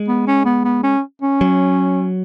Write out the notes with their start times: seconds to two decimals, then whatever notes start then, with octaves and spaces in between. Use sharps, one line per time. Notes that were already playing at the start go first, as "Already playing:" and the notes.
Already playing: G#3
0.08 B3
0.27 C#4
0.45 B3
0.65 B3
0.83 C#4
1.22 C#4
1.41 F#3